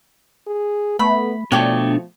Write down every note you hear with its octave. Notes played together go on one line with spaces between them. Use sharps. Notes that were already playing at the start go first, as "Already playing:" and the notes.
G#4
A3 B3 B5
B2 F3 A3 D4 C#5 G5 D6